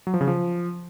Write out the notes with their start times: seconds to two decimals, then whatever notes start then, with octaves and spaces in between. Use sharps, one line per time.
0.07 F#3
0.14 F3
0.21 C#3
0.28 F3